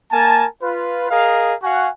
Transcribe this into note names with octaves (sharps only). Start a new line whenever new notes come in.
A#3 A#4 G#5 A5
F4 B4
G#4 A#4 D#5 F5
F#4 F5 F#5 G#5 C#6